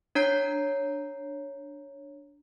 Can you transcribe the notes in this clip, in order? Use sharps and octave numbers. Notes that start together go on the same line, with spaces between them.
D4 C#5 A#5 G6 C7